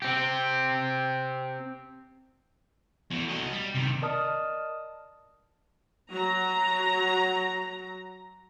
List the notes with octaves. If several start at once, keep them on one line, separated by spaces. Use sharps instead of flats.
C4 G4
E2 A3
F#3 D#5
G3
C3 D#3
A#4 D5 D#5 A5 D#6 F6
F#3 A#5